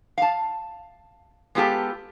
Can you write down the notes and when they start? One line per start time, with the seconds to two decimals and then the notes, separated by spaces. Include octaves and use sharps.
0.18 F5 A5
1.55 G#3 B3 F4 G4 A4